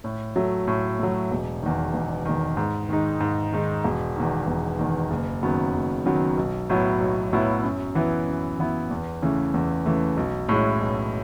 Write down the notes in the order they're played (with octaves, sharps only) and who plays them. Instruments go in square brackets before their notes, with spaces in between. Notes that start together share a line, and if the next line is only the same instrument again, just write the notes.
[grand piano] A2
F#3 A3
A2
F#3 A3
E1
E2 D#3
E1
E2 D#3
G#2
D#3 G#3 D#4
G#2
D#3 G#3 D#4
E1
E2 D#3
E1
E2 D#3
F#1
F#2 D#3 F#3 B3
F#1
F#2 D#3 F#3 B3
B1
A2 F#3 B3 E4
B1
A2 F#3 B3 E4
F#2
E3 B3 E4
F#2
E3 B3 E4
E2
C#3 E3 A3
E2
C#3 E3 A3
B1
A2 G#3 C#4 E4
B1